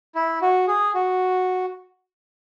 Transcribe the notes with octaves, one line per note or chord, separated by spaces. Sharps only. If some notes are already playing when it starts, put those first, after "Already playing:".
E4
F#4
G#4
F#4